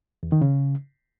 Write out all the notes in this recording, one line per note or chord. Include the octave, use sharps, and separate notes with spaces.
E2
D#3
C#3